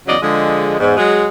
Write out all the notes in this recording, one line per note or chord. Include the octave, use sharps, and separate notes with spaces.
E2 C#3 F#3 D5 D#5
D3 F3 G#3
E2 G#2
F#3 G#3